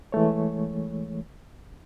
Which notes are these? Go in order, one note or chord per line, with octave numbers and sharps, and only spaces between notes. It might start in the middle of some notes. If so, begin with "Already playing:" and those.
E3 G#3 A3 C#5